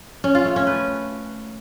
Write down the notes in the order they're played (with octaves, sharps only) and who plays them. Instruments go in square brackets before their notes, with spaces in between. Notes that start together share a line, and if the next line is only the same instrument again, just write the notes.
[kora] C#4
F4
A3
C#4
B4